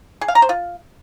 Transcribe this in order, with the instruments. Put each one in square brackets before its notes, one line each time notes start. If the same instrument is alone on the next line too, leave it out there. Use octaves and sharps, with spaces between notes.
[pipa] G#4
F5
A#5
C5
F4